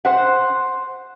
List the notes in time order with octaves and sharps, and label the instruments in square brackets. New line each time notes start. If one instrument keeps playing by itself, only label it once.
[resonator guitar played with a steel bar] C5 F#5